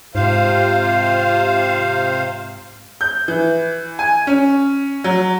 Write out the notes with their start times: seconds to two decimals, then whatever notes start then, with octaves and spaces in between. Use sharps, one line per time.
0.15 G#2 C3 F4 C5 F5
3.01 G6
3.28 E3
3.99 G#5
4.27 C#4
5.04 F#3